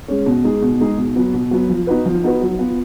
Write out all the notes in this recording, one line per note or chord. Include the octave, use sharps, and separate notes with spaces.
G#3 C#4
B2
G#3 D#4 G#4
B2
G#3 D#4 G#4
B2
F#3 B3
B2
F#3 B3
F3
B3 D#4 F#4 B4
F3
B3 D#4 F#4 B4
F#3
B3 F4